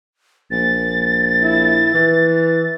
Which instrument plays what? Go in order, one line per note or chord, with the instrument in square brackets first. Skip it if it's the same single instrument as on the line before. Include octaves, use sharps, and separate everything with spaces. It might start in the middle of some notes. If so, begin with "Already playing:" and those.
[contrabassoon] A#1 [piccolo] A6
[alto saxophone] E4
E3